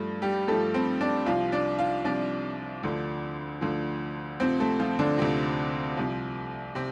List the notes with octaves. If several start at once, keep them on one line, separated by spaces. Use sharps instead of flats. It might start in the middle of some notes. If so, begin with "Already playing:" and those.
Already playing: G2 F3 A3
G3 G4
G2 F3 A3 A4
C4 C5
D4 D5
C2 C3 F3 F4 F5
D4 D5
F4 F5
C2 C3 F3 D4 D5
D2 D3 F3
D2 D3 F3
D2 C3 F3 C4 C5
A3 A4
F3 F4
D3 D4
D2 C3 F3 C4
C2 C3 F3
C3 C4